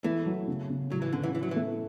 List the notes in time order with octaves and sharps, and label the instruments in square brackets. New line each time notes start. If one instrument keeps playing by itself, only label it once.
[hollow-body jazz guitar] E3 [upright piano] A3
[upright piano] F#3
C#3
C#3
[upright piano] A2 [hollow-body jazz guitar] F#3
[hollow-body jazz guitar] E3
[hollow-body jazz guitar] D3 [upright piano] C#4
[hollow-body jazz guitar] E3
[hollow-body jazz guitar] E3 [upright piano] E4
[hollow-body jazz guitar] F#3
E3
[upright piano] A3